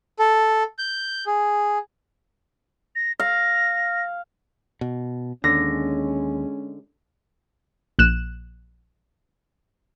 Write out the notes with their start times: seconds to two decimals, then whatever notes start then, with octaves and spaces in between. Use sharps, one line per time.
0.19 A4
0.79 G6
1.27 G#4
2.95 A#6
3.20 F5 A#6
4.81 B2
5.44 D#2 D3 G#3 C#4 A#6
7.99 A#1 F#6 E7